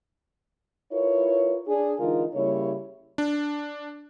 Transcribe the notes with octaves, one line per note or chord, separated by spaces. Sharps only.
E4 F4 A#4 B4 C#5
D4 G#4
D3 E3 G#3 D#4 F4 A#4
C#3 G3 A#3 E4 C#5
D4